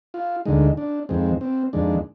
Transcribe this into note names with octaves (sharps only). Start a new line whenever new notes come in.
F4
D2 D3 G#3 D#4
D4
F2 D#3 G#3 C4
C4
F2 D#3 G#3 D4